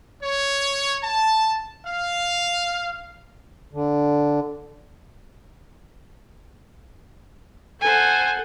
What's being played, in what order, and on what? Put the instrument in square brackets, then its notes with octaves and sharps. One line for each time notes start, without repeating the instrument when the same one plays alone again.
[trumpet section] C#5
A5
F5
[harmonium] D3
[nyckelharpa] A4 F#5 [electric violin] C5 G#5